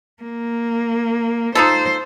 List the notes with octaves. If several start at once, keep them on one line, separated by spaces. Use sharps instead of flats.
A#3
D#4 F4 A4 C5